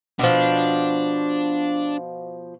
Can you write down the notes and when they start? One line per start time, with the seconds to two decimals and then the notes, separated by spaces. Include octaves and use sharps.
0.19 B2 F3 D4